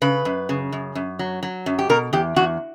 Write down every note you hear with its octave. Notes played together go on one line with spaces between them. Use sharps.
C#3 B4
F#2
C#3
F#2
F#2
F#3
F#3
F#2
G4
B2 A#4
E2 G4
E2 F#4